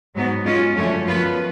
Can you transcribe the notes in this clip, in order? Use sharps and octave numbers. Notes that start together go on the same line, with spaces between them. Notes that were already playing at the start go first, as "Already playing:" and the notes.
G#2 F#3 B3
G#3 C#4 F4
F#2 D3 F3 A3 C#4
F#2 F3 B3 F4 B4